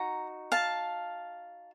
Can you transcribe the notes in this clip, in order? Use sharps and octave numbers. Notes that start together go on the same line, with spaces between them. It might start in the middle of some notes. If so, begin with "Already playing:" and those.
Already playing: D#4 F#4 A#5
F5 A5